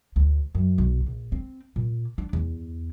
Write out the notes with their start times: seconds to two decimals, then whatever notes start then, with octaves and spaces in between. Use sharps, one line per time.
0.16 D2
0.55 F#2
0.78 B1
1.06 A#1
1.32 C4
1.76 A#2
2.18 D4
2.33 E2